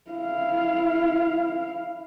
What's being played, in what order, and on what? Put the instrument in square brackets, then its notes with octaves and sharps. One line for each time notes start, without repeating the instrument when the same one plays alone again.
[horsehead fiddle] E4 F5